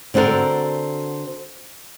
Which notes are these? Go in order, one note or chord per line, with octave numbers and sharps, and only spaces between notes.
D3 C4 F#4 A4 A#4